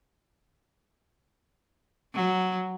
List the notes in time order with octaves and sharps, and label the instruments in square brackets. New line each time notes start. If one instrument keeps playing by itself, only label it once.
[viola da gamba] F#3